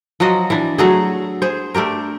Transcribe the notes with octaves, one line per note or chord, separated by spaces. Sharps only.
F3 F#3 F#4 D#5
E3 D4
F#3 A3 F#4 G#4
G#4 C5
A3 D4 G4 A#4